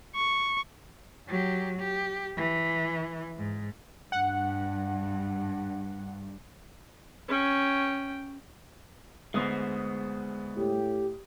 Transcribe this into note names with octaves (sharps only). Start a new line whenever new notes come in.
C#6
F#3 G4
G4
E3
G#2
G2 F#5
C#4 G5
D2 G#3 B3 C5 D#6
A2 G4